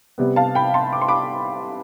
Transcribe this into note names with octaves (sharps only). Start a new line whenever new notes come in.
C3 G3 B3
F5 A5
G5 B5
A5 C6
D6
C6
B5 D6